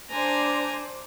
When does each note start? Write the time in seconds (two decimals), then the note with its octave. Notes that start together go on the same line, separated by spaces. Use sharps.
0.11 D4 C5 D5 G#5 A#5